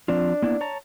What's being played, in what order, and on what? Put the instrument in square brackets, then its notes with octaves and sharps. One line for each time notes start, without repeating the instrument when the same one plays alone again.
[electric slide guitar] F3 C4 F4 [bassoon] D4
[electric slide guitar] A#3 B3 E4
C#5 A5 A#5